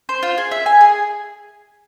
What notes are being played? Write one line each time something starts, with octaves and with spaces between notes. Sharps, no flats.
C5
F4
G#4
E5
G#5
G#4